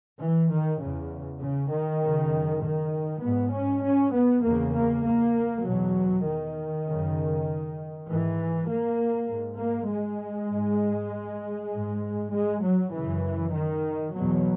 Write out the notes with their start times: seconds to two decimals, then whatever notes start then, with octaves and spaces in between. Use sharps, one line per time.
0.20 E3
0.51 D#3
0.81 E2 C#3
1.41 C#3
1.72 D#3
2.02 F#2 C#3
2.63 D#3
3.23 G#2 B3
3.54 C#4
3.84 C#4
4.14 B3
4.45 E2 C#3 A#3
4.75 A#3
5.06 A#3
5.65 E2 B2 F#3
6.26 D#3
6.87 F#2 C#3
8.08 G#2 E3
8.69 A#3
9.30 G#2
9.60 A#3
9.90 G#3
10.51 G#2
11.73 G#2
12.33 G#3
12.64 F#3
12.94 F#2 C#3 E3
13.54 D#3
14.14 E2 B2 F#3